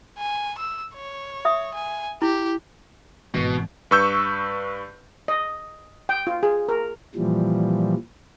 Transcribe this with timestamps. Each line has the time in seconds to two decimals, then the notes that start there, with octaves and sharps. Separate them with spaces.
0.18 G#5
0.58 E6
0.95 C#5
1.45 E5 D#6
1.74 G#5
2.22 E4 G4
3.34 G#1 B2 E3
3.91 G2 B4 C#6 E6 G6
5.28 D#5
6.09 G5
6.27 F4
6.43 G#4
6.69 A#4
7.15 A#2 E3 F3 G3